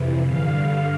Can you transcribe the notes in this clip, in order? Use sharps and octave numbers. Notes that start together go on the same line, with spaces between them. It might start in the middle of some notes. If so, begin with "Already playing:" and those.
Already playing: F2 C3 E3
G2 D3 F5